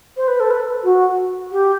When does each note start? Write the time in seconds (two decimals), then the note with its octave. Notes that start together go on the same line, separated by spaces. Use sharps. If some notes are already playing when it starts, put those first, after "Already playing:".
0.17 C5
0.28 B4
0.40 A4
0.51 B4
0.84 F#4
1.52 G4